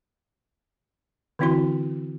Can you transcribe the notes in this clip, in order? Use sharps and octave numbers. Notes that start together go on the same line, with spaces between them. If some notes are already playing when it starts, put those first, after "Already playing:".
D3 E3 C4 E4 F#4 C6